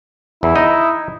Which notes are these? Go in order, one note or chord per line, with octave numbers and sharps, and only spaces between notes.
E2 E4
D#4 D#5